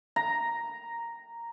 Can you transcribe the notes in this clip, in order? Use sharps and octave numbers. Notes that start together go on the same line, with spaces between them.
A#5